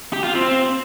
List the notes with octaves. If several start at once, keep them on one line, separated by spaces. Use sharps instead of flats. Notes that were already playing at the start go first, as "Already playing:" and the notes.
G4
F4
C4